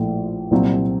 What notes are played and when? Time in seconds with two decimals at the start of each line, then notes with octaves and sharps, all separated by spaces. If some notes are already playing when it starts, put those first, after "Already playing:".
Already playing: A#1 A2 F3 A3
0.51 C2 A#2 F#3 C4 F4